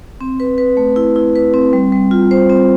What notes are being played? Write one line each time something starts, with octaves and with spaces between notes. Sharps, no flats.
C4
B4
B4
A3
E4
E4
B4
C4
G3
G3
F4
C5
C4